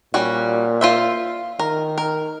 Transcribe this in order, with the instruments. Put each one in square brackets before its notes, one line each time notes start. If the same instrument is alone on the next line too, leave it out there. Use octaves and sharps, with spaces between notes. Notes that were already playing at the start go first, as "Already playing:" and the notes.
[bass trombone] A#2 [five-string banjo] G3 C#4 F#4
[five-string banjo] F4 C5 E5
[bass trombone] D#3 [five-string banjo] A#4
[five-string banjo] A#4